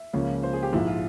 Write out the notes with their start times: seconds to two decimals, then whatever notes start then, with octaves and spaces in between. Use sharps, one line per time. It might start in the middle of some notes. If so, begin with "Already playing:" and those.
Already playing: E5
0.13 C#2 C#3 F3 A#3 C#4
0.43 C5
0.53 G#4
0.63 G4
0.73 A#1 G#2 F3 G#3 E4
0.88 F4